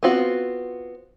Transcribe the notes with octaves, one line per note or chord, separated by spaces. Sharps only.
B3 C4 F4 F#4